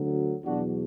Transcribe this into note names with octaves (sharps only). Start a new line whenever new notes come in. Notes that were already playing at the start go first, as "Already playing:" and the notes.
Already playing: D2 D3 F#3
E2 B2 F#3 D4 F#4